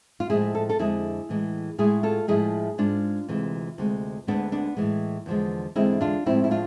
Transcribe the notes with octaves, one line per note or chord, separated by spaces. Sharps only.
F4
A2 F3 G#3 E4 G#4
A4
F4 A4
F2 D3 G#3 E4 G#4
A2 E3 G#3
A2 G#3 E4 G#4
F4 A4
A2 F3 G#3 E4 G#4
G#2 G#3 D4 F4
D2 C3 E3 G#3
D2 C3 G#3
D2 D3 G#3 B3 D4
B3 D4
A2 E3 G#3
E2 D3 F3 G#3
E2 D3 G#3 C4 E4
D4 F4
A2 F3 G#3 C4 E4
E4
D4 F4